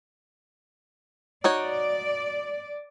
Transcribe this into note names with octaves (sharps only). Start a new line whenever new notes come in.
D#4 F#4 C#5 D5